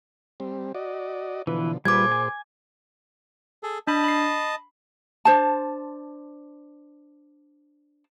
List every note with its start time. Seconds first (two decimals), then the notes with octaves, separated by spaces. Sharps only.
0.40 G3 C4
0.75 F#4 D5 D#5
1.47 B2 D3 E3 F3 B4
1.85 A#2 G3 F4 G#4 B4 C5 D6 G#6
2.12 G#5
3.63 G#4 A4
3.87 D4 D#5 A5 B5
4.04 B5 C7
5.25 D4 C5 A5